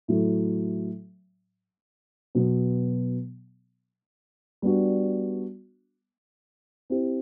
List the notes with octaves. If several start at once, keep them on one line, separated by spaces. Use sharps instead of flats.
A2 F#3 A3
B2 F#3 B3
G3 B3 D4 F#4
C4 E4 G4